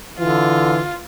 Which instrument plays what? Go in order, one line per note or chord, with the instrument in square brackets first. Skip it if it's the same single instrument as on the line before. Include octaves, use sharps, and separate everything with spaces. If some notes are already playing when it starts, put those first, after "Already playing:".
[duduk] D3 [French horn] E3 [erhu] F4